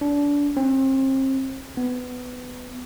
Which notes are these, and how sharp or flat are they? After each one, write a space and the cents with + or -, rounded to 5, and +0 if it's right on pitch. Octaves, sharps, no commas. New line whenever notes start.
D4 -25
C4 +35
B3 +15